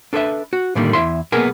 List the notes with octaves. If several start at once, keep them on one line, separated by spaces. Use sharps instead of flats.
D4 A4 B4 C#5 E5
F#4
A2 D3 D#3 G3 A#3
E2 E4 E5 C6
B1 A#3 B3 G#4 A#4 G#5